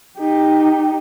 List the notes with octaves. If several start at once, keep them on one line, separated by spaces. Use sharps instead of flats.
D#4 G4